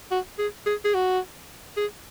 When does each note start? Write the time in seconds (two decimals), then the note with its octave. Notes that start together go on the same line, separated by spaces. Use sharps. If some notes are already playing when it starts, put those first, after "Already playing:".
0.11 F#4
0.39 G#4
0.66 G#4
0.85 G#4
0.94 F#4
1.77 G#4